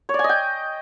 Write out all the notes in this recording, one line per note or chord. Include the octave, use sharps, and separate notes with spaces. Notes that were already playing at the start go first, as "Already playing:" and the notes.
C#5
D5
G#5
D#5
G5